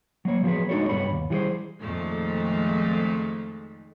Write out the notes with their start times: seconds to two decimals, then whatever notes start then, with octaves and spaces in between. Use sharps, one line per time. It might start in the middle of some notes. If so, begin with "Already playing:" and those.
0.25 F#3 A#3 C#5
0.43 F3 F#3 B3 G4 G#4 B4
0.69 G#3 D4 D#4 F#4 A4 C#5
0.89 C2 G2 G3 B3 C#5 B5
1.11 D#2
1.30 E3 G3 F4 F#4 G#4 C5
1.81 F2 A#2 D#3 F3 G#3 A3